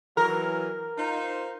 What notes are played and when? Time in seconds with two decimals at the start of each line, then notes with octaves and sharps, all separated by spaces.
0.17 E3 F#3 A#4
0.98 D#4 F4 C5